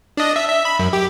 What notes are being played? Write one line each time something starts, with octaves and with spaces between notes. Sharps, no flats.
D4 D#5
E5
E5
B5
F#2
G4